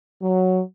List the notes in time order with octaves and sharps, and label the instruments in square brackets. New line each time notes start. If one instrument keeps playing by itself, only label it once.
[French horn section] F#3